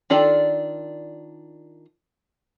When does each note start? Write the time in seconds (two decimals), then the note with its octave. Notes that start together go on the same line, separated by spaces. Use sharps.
0.10 D#3 D4 F4 A4 D5